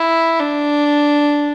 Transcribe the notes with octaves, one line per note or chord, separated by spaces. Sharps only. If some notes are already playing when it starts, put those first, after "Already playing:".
Already playing: E4
D4